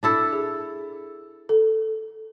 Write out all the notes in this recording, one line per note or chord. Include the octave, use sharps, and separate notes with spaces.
D4 E4 A4
G#4
A4